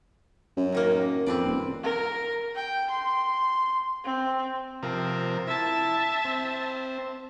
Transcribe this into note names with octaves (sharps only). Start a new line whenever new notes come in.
F#2
A2 D#3 A#3
F2 C4 B4 D5
D#1
A#4
G5
C6
C4
C3 F3 C4 A#4
E4 E5 A5
C4